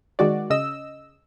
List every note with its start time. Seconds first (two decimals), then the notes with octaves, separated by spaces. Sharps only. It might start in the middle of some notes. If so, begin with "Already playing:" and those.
0.19 D#3 G#3 F#4 D5
0.50 C#3 D#5 E6